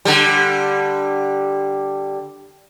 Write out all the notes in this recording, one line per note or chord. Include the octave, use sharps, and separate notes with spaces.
D3 G3